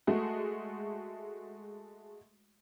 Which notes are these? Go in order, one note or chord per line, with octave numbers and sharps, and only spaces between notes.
G#3 A3 F#4